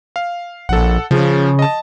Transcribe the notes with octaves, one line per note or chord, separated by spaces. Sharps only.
F5
A#1 A4 F#5
C#3 F3
D#5 A5